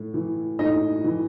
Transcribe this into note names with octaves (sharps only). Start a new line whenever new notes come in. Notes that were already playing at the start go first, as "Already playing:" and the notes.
Already playing: A2
E3
A2 D#4 D#5
E3